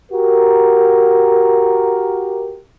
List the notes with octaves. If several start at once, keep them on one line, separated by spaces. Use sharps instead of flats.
F#4 G4 A#4